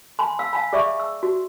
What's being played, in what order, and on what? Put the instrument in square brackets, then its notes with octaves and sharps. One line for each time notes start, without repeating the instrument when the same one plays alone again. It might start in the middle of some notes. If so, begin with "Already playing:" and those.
[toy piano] G#5 B5 C6
F5 E6
F5 G#5 B5
G#4 D5 E5 B5 C#6
E6
F#4